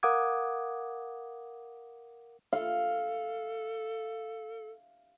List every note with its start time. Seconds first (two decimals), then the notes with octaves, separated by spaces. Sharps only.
0.03 A#4 F5 F#5 D6 D#6 G#6
2.53 A4 F5